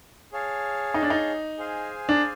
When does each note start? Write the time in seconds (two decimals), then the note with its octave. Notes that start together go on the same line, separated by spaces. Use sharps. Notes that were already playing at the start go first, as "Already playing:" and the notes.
0.32 G#4 C#5 F5 A5
0.94 D#4
1.03 D4
1.10 D#4
1.58 G#4 C5 F5 G#5
2.09 D4